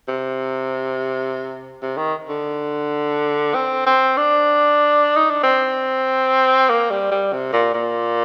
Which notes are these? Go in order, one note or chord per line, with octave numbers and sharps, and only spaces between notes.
C3
C3
D#3
D3
C4
C4
D4
D#4
D4
C4
A#3
G3
G3
C3
A#2
A#2